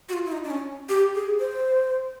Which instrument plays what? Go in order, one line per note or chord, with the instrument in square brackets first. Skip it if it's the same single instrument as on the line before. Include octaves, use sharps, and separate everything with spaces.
[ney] F#4
F4
E4
D#4
D4
C#4
G4
G#4
C5